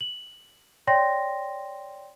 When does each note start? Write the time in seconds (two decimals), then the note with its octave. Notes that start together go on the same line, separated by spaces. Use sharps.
0.01 F#7
0.87 C#5 D5 G5 C6 A#6